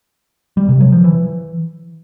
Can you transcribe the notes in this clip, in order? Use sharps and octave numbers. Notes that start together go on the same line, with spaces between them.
G3
C3
F#3
F3
E3